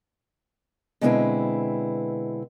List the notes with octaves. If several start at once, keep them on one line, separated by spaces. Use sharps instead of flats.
B2 D3 G#3 C4 E4 B4